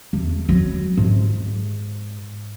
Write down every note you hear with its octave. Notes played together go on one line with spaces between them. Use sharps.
E2
F#3
G#2